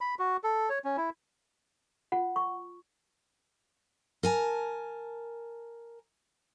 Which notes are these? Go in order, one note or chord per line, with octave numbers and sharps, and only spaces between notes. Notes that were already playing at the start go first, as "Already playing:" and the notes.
B5
F#4
A4
C#5
C#4
E4
F4 F#5
C#6
A#4 G#5 A5